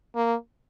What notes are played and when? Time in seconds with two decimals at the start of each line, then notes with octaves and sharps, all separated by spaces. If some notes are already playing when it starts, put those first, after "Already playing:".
0.15 A#3